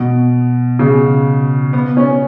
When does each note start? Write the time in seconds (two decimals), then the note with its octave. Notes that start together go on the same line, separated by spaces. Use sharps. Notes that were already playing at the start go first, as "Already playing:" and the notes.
Already playing: B2
0.79 C#3
1.73 B3
1.97 C#4